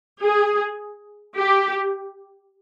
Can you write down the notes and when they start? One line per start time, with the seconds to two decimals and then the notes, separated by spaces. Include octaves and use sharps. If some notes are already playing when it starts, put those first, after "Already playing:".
0.23 G#4
1.37 G4